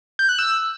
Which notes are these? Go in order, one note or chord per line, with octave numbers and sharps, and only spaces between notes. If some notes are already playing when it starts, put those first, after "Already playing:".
G6
F#6
E6